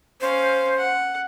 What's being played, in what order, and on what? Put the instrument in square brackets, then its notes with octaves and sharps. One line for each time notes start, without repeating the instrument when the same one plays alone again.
[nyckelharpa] C#4 F5 [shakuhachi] C5
[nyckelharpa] F#5